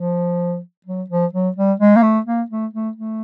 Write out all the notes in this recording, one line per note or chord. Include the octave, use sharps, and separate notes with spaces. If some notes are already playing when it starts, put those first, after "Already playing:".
Already playing: F3
F#3
F3
F#3
G3
G#3
A#3
A3
A#3
A3
A3
A3